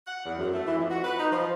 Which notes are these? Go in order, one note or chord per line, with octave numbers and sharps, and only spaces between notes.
F#5
E2
F#2
A3
E3
F2
F#4
B4
D#4
F3